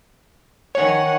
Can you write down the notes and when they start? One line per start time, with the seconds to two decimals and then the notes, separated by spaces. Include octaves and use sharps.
0.75 D#3 C#5 F#5 G#5